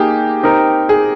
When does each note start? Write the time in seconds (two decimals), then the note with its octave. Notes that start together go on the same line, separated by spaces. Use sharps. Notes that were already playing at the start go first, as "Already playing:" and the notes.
Already playing: A#3 D#4 G4 G#4 D#5
0.43 C4 D#4 A#4
0.89 G#4